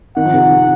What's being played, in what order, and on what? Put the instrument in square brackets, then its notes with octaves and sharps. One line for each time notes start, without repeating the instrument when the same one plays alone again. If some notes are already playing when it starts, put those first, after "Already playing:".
[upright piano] D#3 [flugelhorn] F#5
[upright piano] F3
C3 D#3